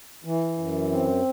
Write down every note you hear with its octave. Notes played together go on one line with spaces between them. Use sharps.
E3
F#2
C4